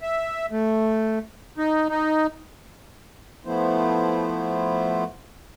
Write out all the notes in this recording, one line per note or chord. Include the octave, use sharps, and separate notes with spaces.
E5
A3
D#4
D#4
F3 A3 B3 E4 C5